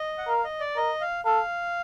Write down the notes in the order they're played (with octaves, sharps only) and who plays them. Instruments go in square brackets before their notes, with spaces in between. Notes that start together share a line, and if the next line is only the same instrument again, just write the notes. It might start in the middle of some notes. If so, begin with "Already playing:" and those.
Already playing: [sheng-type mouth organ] D#5
F#5
[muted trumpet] A#4 [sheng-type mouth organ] F5
[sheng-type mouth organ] D#5
D5
[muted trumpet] A#4 [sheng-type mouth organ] D#5
[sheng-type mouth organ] F5
[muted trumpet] A4 [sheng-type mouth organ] F5